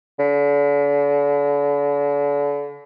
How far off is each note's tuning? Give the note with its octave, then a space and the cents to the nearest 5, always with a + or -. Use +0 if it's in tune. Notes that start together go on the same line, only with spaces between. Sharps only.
D3 -40